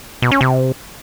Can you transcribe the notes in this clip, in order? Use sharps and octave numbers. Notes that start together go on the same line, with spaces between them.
B2
C#4
C3